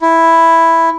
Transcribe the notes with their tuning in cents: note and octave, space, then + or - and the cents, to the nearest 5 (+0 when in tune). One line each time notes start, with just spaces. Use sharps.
E4 +0